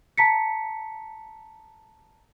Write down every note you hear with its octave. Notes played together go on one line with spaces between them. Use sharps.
A5 A#5 B6 C#7